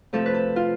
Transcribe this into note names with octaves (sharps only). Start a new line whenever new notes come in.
C3 F3 A3 A4
B4
A4
F4